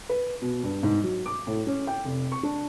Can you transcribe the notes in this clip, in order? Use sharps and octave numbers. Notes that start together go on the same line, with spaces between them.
B4
B2
G2
G#2
F#3
D6
A2
C#4
G5
F1
C#6
D4